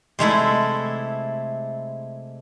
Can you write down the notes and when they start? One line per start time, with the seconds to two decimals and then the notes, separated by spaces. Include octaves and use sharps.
0.19 C3 G#3 A3 E4